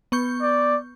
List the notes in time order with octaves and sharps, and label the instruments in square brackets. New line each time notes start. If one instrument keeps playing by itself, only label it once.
[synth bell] B3 C#6 G6
[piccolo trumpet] D5